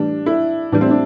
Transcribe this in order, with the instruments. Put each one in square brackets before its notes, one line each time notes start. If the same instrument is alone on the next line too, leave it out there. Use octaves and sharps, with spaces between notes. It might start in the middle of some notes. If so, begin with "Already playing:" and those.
Already playing: [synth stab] A2 E3 G3 [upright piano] D4
[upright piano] E4
[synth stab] A2 E3 G3 [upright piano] D4
[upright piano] C4
D4